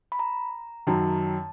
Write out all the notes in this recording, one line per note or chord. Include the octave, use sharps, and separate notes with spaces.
B5
A#5
F#2 D#3 F#3 A5